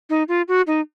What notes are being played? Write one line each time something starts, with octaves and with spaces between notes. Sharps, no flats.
D#4
F4
F#4
D#4